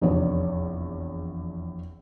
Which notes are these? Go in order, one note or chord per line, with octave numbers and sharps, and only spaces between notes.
F1 A#1 E2 C#5